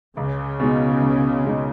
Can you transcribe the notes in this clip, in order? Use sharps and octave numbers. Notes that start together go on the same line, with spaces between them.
C#2 C#3
B2 G#3 D#4
C#2
B2 G#3 D#4